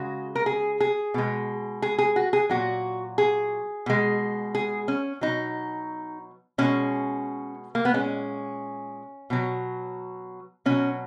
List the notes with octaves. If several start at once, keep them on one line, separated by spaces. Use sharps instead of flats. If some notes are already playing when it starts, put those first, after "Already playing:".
Already playing: C#3 G#3 F#4
A#4
G#4
G#4
B2 G#3
G#4
G#4
F#4
G#4
A#2 F#3 F#4
G#4
B2 G#3
G#4
C#4
B2 F#3 D#4
B2 G#3 C#4
A#3
B3
A#2 G#3 C#4
B2 F#3
B2 F#3 C#4